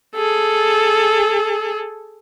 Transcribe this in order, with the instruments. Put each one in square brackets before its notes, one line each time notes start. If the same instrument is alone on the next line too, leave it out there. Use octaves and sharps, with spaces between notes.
[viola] G#4 A4